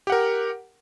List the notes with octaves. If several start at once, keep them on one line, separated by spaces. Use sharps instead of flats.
G4 A#4 F#5